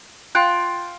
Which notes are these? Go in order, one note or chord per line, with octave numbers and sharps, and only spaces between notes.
F4 G5 F#6